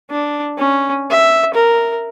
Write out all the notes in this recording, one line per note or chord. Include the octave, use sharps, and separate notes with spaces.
D4
C#4
E5
A#4